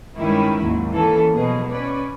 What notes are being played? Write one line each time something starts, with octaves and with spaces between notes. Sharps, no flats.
G2 D#3 G3 G#3 C#4 E4
D#2 G#2 F#3
E3 A#3 C#4 A4
B2 F3 F#3 G#4
C#4 B4 C#5 D5